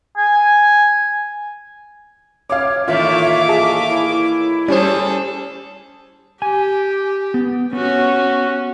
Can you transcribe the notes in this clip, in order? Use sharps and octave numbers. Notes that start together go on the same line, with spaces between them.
G#5
C#5 F5 D6
A2 D#3 E3 A#3 F4 E5 D6
G#4 A5
E4
G3 C#4 G#4 A4 C5
G4 G#5
B3
B3 C#4 F#4